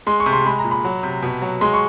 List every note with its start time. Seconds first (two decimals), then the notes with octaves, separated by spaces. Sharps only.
0.07 G#3 C6
0.20 C#6
0.26 C3
0.33 C6
0.46 G#3 B5
0.59 A#5
0.64 A#2
0.71 B5
0.84 F#3
1.03 C3
1.23 B2
1.42 F#3
1.61 G#3 C6
1.74 C#6